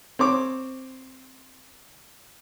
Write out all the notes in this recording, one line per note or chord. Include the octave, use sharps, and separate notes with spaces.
C4 C#5 D6